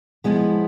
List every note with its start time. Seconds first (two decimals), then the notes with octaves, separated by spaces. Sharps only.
0.24 F3 G#3 B3 E4